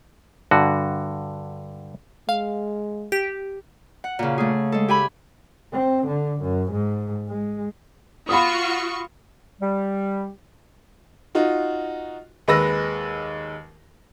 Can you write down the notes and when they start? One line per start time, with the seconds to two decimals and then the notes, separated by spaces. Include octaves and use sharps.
0.51 G2 D3 F#4
2.29 G#3 F5
3.12 G4
4.04 F#5
4.19 A#2 C#3
4.38 A3 G#4
4.72 G#3 A4
4.88 G4 G#5 B5
5.73 C4
6.07 D3
6.41 F#2
6.72 G#2
7.28 G#3
8.29 F4 F#4 B5 C#6 D#6
9.61 G3
11.35 D#4 F4 F#4
12.48 D#2 G#3 B4 E6 A#6